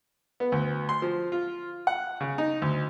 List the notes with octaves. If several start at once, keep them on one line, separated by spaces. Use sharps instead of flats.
B3
D2
C6
F3
F4
F#5
C#3
D#4
D2